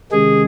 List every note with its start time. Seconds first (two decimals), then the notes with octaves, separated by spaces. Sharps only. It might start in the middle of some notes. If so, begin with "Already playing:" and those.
0.12 C3 D#3 G#3 C#4 G#4